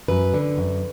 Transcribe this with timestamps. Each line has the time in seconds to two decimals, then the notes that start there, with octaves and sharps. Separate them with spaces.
0.08 F#2 B4
0.34 D3
0.57 F#2